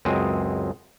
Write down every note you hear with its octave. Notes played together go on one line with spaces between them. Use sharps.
C#2 F#2 G#3 C4 D#5